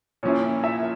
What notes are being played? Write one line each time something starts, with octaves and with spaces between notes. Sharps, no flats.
A#2 F3 C#4 E4 C#5
E5